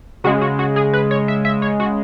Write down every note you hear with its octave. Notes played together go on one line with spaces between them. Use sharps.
C#3 G#3 F#4
F#4
F#4
G#4
B4
C#5
E5
E5
C#5
F#4